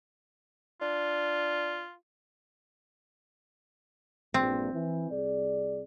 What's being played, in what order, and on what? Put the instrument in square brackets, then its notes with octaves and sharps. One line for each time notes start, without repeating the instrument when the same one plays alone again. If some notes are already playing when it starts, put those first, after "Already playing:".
[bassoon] D4 [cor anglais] F4
[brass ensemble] A#1 G2 [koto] C4
[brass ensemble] E3
C2 G#4 D5